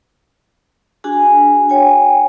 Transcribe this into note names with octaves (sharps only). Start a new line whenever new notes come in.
D4 F#4 G#4 G#5
C#5 G5 G#5